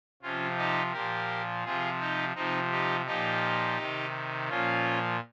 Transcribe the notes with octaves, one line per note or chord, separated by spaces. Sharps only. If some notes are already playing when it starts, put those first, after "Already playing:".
C3 F3 C#4 F4
D#4 G4
A#2 F3 G4 A#4
C3 F3 F4 G#4
D#4 G4
C3 F3 C4 D#4
D#4 G4
A#2 F3 D#4 G4
C3 D#3
A#2 F3 C#4 F4